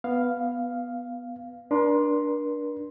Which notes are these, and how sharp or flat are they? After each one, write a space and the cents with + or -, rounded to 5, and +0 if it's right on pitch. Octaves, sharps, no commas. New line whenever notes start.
B3 +0 F5 +0
D4 +0 A#4 +45 C6 +0